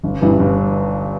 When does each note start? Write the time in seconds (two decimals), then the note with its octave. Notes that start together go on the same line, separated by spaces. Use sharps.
0.04 G1
0.21 G2 E3
0.39 G1